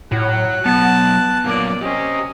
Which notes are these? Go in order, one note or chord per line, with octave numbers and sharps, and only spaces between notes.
A2 F#4 C#5 F#6
B2 F#3 B3 A5
F#2 A#2 A#3 D5
C#4 G4 C5 D#5